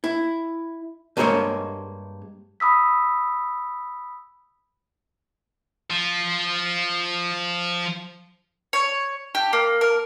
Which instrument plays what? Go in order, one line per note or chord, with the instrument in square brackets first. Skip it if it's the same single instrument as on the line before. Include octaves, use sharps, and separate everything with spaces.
[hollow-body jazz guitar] E4
G2 G#3 A#3 C5 C#5 D#5
[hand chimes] B5 D#6 E6 B6
[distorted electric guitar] F3 F4
[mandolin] C#5
G4
A#3
A#4